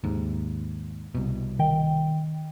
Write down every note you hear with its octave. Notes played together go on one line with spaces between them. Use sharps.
D#2 G#2
C2 B2
D#3 G5